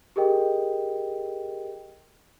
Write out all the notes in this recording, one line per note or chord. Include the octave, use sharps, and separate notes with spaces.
G4 G#4 A#4 D#5 G5